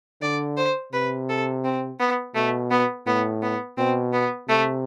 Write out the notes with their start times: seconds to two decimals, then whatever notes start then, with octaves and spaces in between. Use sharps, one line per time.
0.22 D3 D5
0.57 C5
0.93 C3 B4
1.29 A4
1.64 C4
2.00 B3
2.35 B2 A3
2.71 B3
3.07 A2 B3
3.43 B3
3.78 B2 C4
4.13 B3
4.49 C3 A3